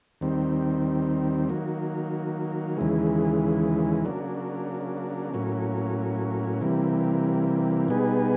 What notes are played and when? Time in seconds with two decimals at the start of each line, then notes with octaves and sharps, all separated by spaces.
0.21 D#2 D#3 G3 C4
1.49 D#3 F#3 A#3
2.77 D#2 C#3 E3 G#3
4.05 C#3 F#3 A#3 D4
5.34 A2 F#3 A#3 C#4
6.61 C3 E3 G3 A#3
7.88 B2 G3 B3 D#4 G#4